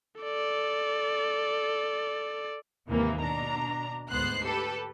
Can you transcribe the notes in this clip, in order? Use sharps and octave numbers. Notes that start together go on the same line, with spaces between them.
A4 D5
D#2 G#2 C3 E3 A#3
B2 D4 A#5
D2 G#2 B3 C5 F#6 C7
G4 A4 B4